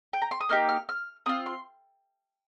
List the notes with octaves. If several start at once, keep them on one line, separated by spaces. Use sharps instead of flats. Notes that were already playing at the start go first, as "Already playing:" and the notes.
G5
A#5
C6
D#6
A#3 D#4 G4 F6
F6
F6
C4 F4 D#6
C6